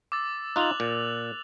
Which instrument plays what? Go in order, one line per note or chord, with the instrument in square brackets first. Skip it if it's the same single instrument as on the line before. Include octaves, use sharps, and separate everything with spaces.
[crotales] D6 E6 A6
[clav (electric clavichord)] D#4 F4 [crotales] F#6 F7 F#7
[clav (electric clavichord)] A#2